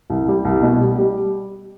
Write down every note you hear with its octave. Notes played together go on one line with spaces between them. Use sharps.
C2
G3
C2
B2
G3
G3